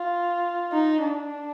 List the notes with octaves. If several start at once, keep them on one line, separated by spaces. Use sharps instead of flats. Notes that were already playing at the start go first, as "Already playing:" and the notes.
Already playing: F4
D#4
D4